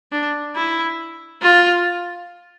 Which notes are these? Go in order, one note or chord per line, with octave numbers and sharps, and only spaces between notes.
D4
E4
F4